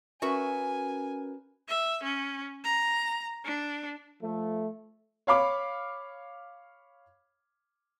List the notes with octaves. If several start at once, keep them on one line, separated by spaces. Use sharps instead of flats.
C#4 F#4 A#4 B4 E5 G#5
E5
C#4
A#5
D4
F3 A3
C#5 F5 B5 D6